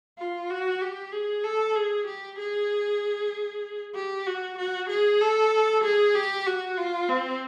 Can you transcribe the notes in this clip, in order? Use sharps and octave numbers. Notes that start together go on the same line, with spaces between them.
F4
F#4
G4
G#4
A4
G#4
G4
G#4
G4
F#4
F#4
G#4
A4
G#4
G4
F#4
F4
C4